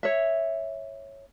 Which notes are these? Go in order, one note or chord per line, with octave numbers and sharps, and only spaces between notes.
C#5 E5